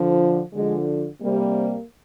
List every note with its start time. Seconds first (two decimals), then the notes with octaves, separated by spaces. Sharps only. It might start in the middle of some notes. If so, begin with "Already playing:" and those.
Already playing: D3 F3
0.54 D3 F3 G#3
1.21 C3 G3 A#3